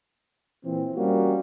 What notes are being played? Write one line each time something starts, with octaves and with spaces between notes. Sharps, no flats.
A#2 E3 C4
G3 A#3 C#4 F4 F#4